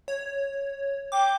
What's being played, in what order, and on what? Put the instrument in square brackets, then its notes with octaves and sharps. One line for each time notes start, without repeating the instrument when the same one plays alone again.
[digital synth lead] C#5
[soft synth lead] G5 [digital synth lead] D6